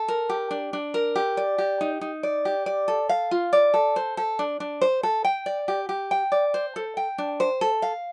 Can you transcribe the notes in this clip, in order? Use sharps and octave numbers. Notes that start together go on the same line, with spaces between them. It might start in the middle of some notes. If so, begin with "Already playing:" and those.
Already playing: A4
A#4
G4
D4
D4
A#4
G4
D5
G4
D#4
D#4
D5
G4
D5
A4
F5
F4
D5
A4
C5
A4
D4
D4
C5
A4
G5
D5
G4
G4
G5
D5
C5
A4
G5
D4
C5
A4
F5